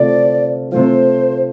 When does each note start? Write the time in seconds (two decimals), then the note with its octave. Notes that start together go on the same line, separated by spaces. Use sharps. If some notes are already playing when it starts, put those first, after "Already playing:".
Already playing: C3 A3 F4 D5
0.71 C3 A3 F4 C5